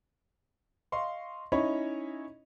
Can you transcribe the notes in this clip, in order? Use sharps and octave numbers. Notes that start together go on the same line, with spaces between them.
D#5 F5 C6 C#6
C#4 D#4 E4 C#5 D#5 B5